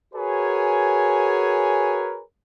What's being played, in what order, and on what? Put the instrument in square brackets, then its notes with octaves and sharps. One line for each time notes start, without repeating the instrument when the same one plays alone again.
[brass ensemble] F#4 G#4 A#4 B4 C#5 G#5